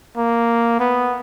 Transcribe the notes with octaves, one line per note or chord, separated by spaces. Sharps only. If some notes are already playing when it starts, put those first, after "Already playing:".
A#3
B3